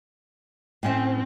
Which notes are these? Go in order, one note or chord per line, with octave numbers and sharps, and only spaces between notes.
A2 C4 C#4 E5